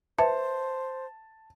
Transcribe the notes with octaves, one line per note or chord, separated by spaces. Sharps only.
B4 C5 E5 A5